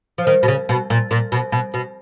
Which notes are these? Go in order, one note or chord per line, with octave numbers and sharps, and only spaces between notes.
F3
D#3
B2
C#3
B2
A#2
A#2
B2
B2
B2